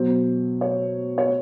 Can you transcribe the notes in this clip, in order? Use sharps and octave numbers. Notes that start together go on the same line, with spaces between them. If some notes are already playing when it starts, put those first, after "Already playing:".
Already playing: B2 F#3 C5
C#5
C#5